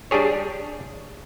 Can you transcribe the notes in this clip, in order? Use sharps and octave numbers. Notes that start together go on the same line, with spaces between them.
G3 D4 G4 G#4 C#5